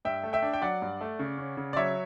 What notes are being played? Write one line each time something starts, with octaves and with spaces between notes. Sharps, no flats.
G2 E5 G5
A3
E5 G5
D4
G5
F#3 D5 F#5
G2
A3
C#3
C#4
C#3
D5
F#3 C#5 E5